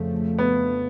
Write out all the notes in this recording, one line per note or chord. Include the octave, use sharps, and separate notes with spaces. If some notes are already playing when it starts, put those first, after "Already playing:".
Already playing: F2 C#3 F3 A3
B3